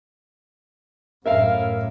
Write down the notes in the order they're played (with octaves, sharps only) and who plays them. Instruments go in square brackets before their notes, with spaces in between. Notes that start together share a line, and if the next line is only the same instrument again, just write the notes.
[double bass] F#2 A2 [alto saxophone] A#4 [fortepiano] E5 F5